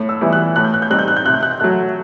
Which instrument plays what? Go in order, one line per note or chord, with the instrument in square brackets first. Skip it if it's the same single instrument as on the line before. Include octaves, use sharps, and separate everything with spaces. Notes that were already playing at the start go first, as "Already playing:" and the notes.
Already playing: [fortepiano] A2
[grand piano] E6
[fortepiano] E3 G3 B3 E4
[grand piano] F#6
[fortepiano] A2 [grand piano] F#6
[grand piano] G6
F#6
G6
[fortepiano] G3 C4 D#4 [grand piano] F#6
[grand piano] G6
F#6
G6
[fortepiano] C3 [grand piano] F#6
[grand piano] G6
F#6
G6
[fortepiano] F#3 A3 [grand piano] F#6